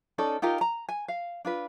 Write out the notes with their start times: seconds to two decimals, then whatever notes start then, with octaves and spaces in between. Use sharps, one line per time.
0.18 C#4 D#4 A4 D5
0.42 D#4 F4 G4 A#4
0.61 A#5
0.89 G#5
1.08 F5
1.45 D4 F4 B4